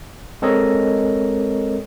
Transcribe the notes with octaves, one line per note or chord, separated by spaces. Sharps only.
G#3 C4 A4 A#4 C#5 D#5